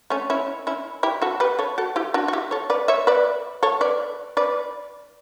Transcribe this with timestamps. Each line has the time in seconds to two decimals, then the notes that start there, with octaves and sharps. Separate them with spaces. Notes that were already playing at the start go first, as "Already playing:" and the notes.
0.10 A3 C#4
0.30 C#4 E4
0.67 C#4 E4
1.03 E4 G4
1.22 F#4 A4
1.40 G4 B4
1.59 A4 C#5
1.78 F#4 A4
1.96 E4 G4
2.14 D4 F#4
2.28 F#4
2.33 E4 G4
2.51 A4 C#5
2.70 B4 D5
2.88 C#5 E5
3.07 B4 D5
3.63 A4 C#5
3.81 B4 D5
4.37 B4 D5